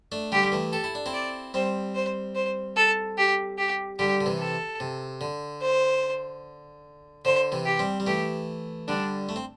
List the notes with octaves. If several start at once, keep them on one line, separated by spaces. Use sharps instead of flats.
A3 D4
D3 G3 G4
G3
E3 A3
G4 A4
E4
D4
C4 E4
D5
G3 C4 C5
C5
C5
A4
G4
G4
D3 G3 G4
D3
C3 E3
A4
C3
D3
C5
D3 C5
C3 E3
G4
G3 C4
G3
E3 A3 G4
D3 G3 D4
A3
C4